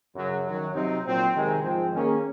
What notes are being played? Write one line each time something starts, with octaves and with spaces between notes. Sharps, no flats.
F#2 C#3 F#3
F#2 D#3 F#3
C3 F#3 C4 D#4
A#2 F#3 C4
C3 D#3 G#3
G#2 F3 G#3 C4
D#3 A#3 C#4 G#4